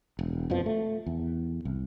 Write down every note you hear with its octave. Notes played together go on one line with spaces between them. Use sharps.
E1
F2 B2 F3
A3
E2
C2